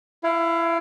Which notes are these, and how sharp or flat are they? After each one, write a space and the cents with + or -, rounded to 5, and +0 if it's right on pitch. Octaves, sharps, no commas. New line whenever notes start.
E4 +25 F5 +0